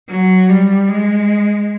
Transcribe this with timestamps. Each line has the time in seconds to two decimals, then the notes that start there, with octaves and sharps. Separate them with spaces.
0.10 F#3
0.49 G3
0.88 G#3